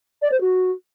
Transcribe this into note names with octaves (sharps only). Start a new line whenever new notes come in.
D5
C5
F#4